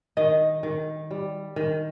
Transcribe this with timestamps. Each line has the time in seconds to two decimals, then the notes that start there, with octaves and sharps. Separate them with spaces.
0.17 D#3 D#5
0.63 D#3
1.11 G3
1.56 D#3